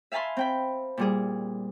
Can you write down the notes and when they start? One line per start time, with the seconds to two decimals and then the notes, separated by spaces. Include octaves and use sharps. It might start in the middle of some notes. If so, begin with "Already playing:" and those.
0.12 E5 F5 G#5 A5 B5 C6
0.37 C4 G5 B5
0.97 A#2 G3 G#4